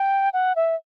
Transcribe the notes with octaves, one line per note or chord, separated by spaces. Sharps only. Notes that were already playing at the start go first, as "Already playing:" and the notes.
Already playing: G5
F#5
E5